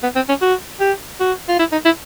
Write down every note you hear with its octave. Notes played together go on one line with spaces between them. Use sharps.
B3
C4
C#4
F#4
G4
F#4
F4
E4
D#4
E4